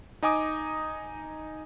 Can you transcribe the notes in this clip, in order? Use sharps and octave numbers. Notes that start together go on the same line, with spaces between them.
D#4 D#5 G#5 D6 D#6